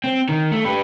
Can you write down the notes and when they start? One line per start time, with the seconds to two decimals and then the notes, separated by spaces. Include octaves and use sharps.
0.04 C4
0.29 D#3
0.51 A3
0.65 G4 B4